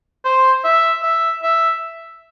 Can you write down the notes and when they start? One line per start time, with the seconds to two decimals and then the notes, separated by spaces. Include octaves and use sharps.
0.25 C5
0.64 E5
1.03 E5
1.42 E5